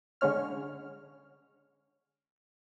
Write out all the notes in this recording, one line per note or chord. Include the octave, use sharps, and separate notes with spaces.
D3 G#3 C#4 C#5 F6